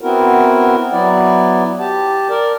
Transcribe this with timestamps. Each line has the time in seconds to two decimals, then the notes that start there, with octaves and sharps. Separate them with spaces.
0.01 B3 C4 E4 F#4 A#4
0.92 F#3 B3 E4 D5
1.79 G4 A5
2.30 A#4 D5